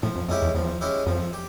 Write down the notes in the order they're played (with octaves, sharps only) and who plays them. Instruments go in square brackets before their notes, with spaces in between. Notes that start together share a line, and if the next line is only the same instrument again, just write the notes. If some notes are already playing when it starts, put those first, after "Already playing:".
[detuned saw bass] A2 [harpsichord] F3
[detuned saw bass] F2
[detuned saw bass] F2 [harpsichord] G#3 C#4 E4 G4
[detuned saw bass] E2
[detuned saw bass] E2 [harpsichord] F3
[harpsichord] G#3 C#4 E4 G4
[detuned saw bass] F2 [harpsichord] F3
[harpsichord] G4